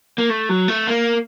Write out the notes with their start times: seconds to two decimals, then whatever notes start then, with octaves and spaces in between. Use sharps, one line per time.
0.18 A#3
0.30 A3
0.49 F#3
0.68 A3
0.87 A#3